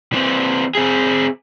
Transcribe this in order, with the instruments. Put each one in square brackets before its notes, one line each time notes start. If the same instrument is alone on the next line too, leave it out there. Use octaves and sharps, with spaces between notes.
[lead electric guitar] E3 C4
C4 G#4